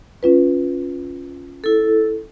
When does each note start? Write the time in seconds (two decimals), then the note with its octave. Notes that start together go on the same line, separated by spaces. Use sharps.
0.23 C#4 F4 B4
1.64 E4 A4